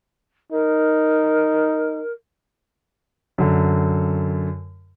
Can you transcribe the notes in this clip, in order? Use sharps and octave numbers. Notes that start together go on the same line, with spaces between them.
D#4 A#4
F#2 D3